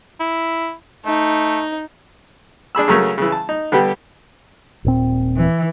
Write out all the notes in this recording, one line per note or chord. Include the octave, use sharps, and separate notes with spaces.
E4
A3 D#4
D4 G#4 B5 E6
C#3 F#3 A3 C#4 A#4
C#3 E3
A5
D#4
D3 G3 B3 G4
D#1 A#2 C4
E3